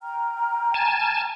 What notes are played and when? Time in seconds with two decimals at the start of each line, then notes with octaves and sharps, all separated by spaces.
0.02 G5 A#5 F6
0.74 G#5 A5